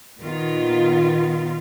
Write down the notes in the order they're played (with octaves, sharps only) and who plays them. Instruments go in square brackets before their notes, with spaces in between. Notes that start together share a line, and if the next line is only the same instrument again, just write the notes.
[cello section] A#2 D#3 B3 F4